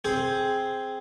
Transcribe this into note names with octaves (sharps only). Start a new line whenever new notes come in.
C4 G#4 C5